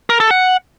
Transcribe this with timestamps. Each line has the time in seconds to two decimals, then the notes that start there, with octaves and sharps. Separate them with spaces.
0.10 A#4
0.20 A4
0.31 F#5